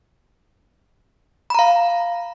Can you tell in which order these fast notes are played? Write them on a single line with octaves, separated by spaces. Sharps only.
B5 A#5 F5